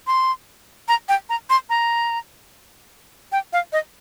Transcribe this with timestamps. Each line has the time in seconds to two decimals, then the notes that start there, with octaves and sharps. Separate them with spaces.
0.07 C6
0.88 A#5
1.09 G5
1.29 A#5
1.50 C6
1.70 A#5
3.32 G5
3.53 F5
3.73 D#5